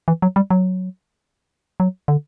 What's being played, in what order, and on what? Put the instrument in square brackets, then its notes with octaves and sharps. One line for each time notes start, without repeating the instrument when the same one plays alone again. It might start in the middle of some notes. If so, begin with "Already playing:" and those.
[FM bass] E3
F#3
G3
F#3
F#3
D3